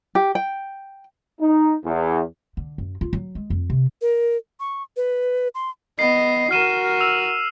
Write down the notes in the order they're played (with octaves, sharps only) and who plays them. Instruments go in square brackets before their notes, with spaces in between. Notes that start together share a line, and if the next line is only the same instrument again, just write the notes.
[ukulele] G4
G5
[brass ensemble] D#4
E2
[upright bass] D3
F#2
F4
F#3
G#3
F2
C3
[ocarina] A#4
C#6
B4
C6
[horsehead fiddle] B3 D#5 [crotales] C7
[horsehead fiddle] F#4 A#4 [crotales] F6 D#7 E7
[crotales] E6 F7